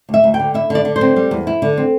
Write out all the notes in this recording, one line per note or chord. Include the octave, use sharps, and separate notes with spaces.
D2
E5
D2
G5
D3
E4 E5
D3
D5
D3
C5
C4
G3
E2
E4
D3
C4